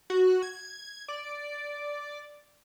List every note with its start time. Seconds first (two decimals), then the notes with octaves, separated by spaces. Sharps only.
0.10 F#4
0.43 G#6
1.08 D5